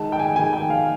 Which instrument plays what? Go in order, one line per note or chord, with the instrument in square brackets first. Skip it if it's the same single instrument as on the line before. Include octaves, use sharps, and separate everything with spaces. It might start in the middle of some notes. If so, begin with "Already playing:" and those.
Already playing: [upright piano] D#3 G#3 A5
G5
G#5
D#3 G#3 G#5
G5
F5